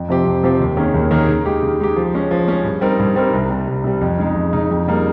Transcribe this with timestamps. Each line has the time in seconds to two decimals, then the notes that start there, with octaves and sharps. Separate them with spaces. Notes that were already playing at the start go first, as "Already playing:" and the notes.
Already playing: F2
0.08 C3 F3 C4 G4
0.25 F2
0.43 C3 F3 C4 G4
0.60 D#2
0.77 D#3 A#3 C#4 G#4
0.94 D#2
1.11 D#3 A#3 C#4 G#4
1.28 C#3
1.45 G#3 D#4 G4
1.62 C#3
1.80 G#3 D#4 G4
1.96 F3
2.13 G#3 C#4
2.31 F3
2.48 G#3 C#4
2.64 G2
2.81 G3 C4 D#4 A#4
2.99 G2
3.16 G3 C4 D#4 A#4
3.33 C2
3.50 C3 G3
3.67 C2
3.84 C3 G3
4.01 F2
4.18 C#3 G#3 D#4
4.35 F2
4.53 C#3 G#3 D#4
4.70 F2
4.86 C#3 G3 A#3 D#4